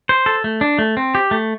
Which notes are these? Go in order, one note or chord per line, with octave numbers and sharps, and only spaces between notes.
C5
A4
A3
D4
A3
C4
G4
A3